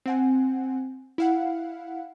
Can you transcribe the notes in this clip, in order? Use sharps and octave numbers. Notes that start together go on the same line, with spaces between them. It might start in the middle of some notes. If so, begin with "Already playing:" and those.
C4 F#5 G#5
E4 F5 F#5